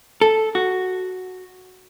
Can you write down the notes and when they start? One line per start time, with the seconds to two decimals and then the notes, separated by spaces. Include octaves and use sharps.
0.21 A4
0.55 F#4